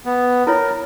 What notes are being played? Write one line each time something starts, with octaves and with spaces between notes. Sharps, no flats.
B3
E4 F4 A#4 C#5